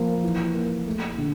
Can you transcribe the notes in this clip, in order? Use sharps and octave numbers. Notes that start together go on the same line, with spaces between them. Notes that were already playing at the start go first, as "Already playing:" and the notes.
Already playing: F3 A#3
E3
A#3
A3
D3